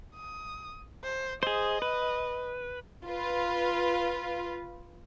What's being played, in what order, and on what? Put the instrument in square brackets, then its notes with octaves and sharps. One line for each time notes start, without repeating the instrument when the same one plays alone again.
[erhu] D#6
C5
[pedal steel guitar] G#4 C5 [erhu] D#5
[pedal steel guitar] B4
[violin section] F4 B4